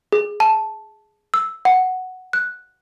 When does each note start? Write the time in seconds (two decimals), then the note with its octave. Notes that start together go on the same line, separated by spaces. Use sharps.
0.13 G#4
0.40 A5
1.34 E6
1.65 F#5
2.33 F#6